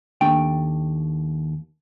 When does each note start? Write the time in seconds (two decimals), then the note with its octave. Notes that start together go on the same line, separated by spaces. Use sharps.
0.21 D#2 A3 D4 G5